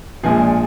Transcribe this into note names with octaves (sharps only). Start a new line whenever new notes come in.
A#1 A#2 F3 G#3 G#4